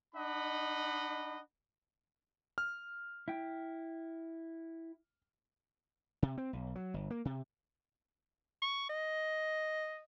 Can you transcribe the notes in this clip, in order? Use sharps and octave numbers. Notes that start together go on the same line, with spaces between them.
D4 D#4 D#5 F#5 B5
F6
E4 G5
C3
C4
B1
F#3
G1
A#3
C3
C#6
D#5